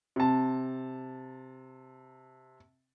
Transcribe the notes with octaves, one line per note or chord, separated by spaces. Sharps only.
C3 A5